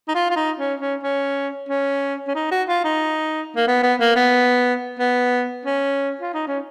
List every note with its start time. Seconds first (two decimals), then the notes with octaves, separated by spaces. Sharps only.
0.08 D#4
0.15 F4
0.31 F4
0.36 D#4
0.59 C#4
0.80 C#4
1.03 C#4
1.69 C#4
2.27 C#4
2.35 D#4
2.51 F#4
2.68 F4
2.84 D#4
3.56 A#3
3.67 B3
3.83 B3
4.00 A#3
4.16 B3
4.99 B3
5.65 C#4
6.21 F4
6.34 D#4
6.47 C#4